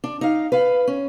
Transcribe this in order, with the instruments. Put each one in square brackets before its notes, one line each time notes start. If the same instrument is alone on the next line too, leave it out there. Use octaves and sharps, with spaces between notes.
[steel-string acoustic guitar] D4
D#4 F5
B4 F5
C#4